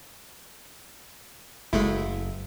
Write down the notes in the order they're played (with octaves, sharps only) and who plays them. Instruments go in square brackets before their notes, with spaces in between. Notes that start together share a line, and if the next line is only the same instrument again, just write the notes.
[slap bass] F#1 [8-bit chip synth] G#3 A3 E4